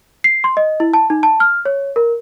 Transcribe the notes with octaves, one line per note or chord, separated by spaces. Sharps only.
C7
C6
D#5
E4
A5
D#4
A5
F6
C#5
A#4